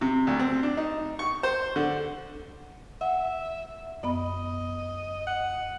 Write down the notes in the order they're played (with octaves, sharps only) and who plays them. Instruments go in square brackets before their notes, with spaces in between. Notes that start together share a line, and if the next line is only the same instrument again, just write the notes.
[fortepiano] C3
D2
C4
D4
D#4
C#6
C5
D3
[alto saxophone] E5 [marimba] F#5
[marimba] F#2 B3 B5 [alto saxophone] D#5
[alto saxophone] F#5